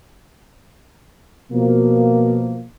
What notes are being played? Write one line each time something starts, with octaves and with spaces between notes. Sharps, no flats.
B2 F3 A#3